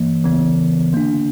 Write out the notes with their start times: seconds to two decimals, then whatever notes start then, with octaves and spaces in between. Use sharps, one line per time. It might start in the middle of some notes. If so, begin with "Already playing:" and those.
Already playing: G2 E3 A#3
0.24 D2 C#3 E3 B3
0.93 D3 A#3 D4